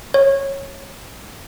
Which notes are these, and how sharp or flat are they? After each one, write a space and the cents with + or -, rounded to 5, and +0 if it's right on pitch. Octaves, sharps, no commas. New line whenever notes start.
C#5 -15